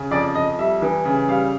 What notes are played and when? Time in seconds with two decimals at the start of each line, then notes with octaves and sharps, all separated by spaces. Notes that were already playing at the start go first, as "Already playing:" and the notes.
Already playing: C#3
0.11 F2 D5
0.35 F2 D#5
0.59 G3 E5
0.82 E3
1.05 C#3
1.28 G3 F5